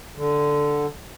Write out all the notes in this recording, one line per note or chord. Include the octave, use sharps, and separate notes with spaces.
D3